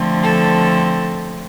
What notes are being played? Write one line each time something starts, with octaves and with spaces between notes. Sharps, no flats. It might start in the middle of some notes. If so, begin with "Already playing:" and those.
Already playing: D3 F3 A3 C4
A4